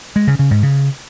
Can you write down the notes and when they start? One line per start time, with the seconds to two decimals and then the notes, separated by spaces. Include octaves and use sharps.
0.16 G#3
0.27 C#3
0.39 C#3
0.51 G#2
0.63 C#3